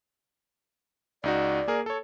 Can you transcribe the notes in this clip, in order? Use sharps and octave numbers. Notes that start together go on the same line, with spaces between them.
C#2 D#4 F#4 D5
A#3 G#4 A#4
A4 C#5